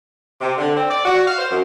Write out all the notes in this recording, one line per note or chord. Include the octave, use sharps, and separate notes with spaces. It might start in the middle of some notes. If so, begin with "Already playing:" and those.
C3
D3
C4
D5
F#4
F5
C5
F#2